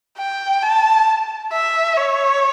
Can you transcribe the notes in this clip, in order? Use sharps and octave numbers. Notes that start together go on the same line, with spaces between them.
G5
A5
E5
C#5